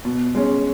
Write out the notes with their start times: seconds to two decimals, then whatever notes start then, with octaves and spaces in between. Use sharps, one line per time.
0.05 B2
0.35 G#3 C#4